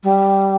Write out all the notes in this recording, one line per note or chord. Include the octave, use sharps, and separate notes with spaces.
G3